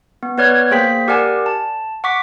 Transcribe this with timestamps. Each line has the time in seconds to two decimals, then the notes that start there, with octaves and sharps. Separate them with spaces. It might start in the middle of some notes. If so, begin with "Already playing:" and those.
0.23 B3
0.38 B3 B4 C#5 D5 F6 G#6
0.71 A#3 G#4 C5 G5 B6
1.08 G4 A#4 D5 F#5 G#5
1.46 A5
2.04 F#5 C#6 D6 B6